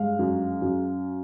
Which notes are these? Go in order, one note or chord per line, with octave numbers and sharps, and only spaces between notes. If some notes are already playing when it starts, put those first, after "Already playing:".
Already playing: G2 G#3 F5
F#2
F#2